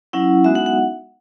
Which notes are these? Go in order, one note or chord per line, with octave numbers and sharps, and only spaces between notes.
F#3 C#4 E4 F#5
G#3 B3 D#4 F#4 E5
F#5
F#5